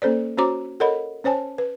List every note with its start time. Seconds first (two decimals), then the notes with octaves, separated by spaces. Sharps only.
0.02 A#3 C#4 A4 C5 D5
0.38 C#4 F#4 C5 C#5 A#5 D6
0.80 A4 A#4 C#5 D#5 F#5 B5
1.24 C#4 C5 C#5 G#5 A5
1.58 B4